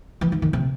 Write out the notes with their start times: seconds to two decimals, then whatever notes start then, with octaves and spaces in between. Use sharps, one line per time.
0.21 E3
0.32 D#3
0.42 D#3
0.53 C3